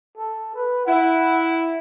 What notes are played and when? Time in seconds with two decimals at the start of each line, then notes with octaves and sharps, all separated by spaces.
0.17 A4
0.55 B4
0.86 E4 F#5